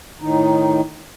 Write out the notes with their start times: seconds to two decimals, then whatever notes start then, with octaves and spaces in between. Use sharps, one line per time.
0.21 A2 D#3 D#4